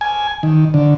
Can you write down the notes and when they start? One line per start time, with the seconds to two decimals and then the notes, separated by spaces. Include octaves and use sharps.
0.01 G#5
0.43 D#3
0.74 D3